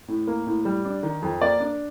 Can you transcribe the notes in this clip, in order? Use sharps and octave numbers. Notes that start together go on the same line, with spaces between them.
A2
A#3
A2
G3
D4
D#3
F2
A#3 D5
D4